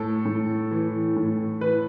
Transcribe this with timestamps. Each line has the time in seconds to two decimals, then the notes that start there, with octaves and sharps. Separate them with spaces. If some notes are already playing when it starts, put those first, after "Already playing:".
Already playing: A2 A4
0.25 A2
0.71 E3
1.16 A2
1.61 E3 B4